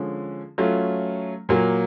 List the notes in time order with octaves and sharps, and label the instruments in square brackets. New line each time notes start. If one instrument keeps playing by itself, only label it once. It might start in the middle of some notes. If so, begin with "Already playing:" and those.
Already playing: [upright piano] D3 F3 G#3 C#4
F#3 A3 C#4 F4
A#2 F#3 A#3